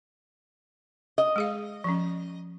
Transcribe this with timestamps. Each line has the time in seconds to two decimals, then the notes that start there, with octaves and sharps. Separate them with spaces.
1.18 D#5
1.36 G#3 G#4 F5
1.84 F3 C#4